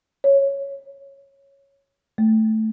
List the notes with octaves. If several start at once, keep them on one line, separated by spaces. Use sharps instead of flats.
C#5
A3